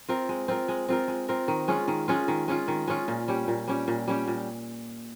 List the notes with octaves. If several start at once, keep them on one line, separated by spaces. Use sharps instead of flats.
C4 F4 A#4
G#3
C4 F4 A#4
G#3
C4 F4 A#4
G#3
C4 F4 A#4
D#3
G#3 C#4 F4
D#3
G#3 C#4 F4
D#3
G#3 C#4 F4
D#3
G#3 C#4 F4
A#2
G3 C#4 G4
A#2
G3 C#4 G4
A#2
G3 C#4 G4
A#2